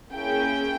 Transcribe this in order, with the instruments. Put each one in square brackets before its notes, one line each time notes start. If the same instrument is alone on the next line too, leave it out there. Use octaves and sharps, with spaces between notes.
[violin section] A#3 C#4 E4 G#4 G5